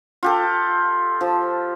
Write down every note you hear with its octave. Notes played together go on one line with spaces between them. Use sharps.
F4 G4 A4
F3